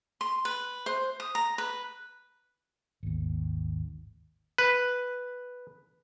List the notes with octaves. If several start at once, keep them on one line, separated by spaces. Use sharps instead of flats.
C6
B4
C5
D#6
A#5
B4
G#1 D#2
B4